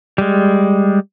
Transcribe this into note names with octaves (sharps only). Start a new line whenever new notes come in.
G3 G#3